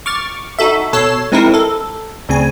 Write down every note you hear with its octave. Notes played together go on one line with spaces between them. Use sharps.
C#6 D6 F6 A6
D#4 F#4 A4 E5
B2 A4 C#5 C7 E7
G#3 C4 D#4 E4 A#4
A4
D2 C#3 C4 G#5